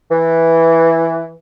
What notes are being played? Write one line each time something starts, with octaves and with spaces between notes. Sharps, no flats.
E3